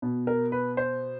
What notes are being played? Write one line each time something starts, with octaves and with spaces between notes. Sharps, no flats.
B2
A#4
B4
C5